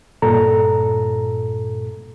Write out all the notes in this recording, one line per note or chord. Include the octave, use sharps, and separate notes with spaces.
G2 A#2 A4 A#5